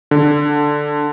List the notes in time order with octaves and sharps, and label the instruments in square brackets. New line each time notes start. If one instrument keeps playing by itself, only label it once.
[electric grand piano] D3